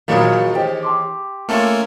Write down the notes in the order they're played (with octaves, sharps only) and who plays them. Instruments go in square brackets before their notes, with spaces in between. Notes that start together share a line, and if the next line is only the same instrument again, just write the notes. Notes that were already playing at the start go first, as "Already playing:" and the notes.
[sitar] D#2 E3 G#4 [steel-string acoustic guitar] A#2 F#3 [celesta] F5 B5 D#6
[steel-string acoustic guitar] G4 [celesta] C5 D#5 G5
[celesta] A5 C6 D6
[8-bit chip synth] A3 A#3 C#4 [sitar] F4 A4